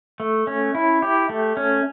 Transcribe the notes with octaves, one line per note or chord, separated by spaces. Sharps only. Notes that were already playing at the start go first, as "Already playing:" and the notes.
A3
C#4
E4
G4
A3
C#4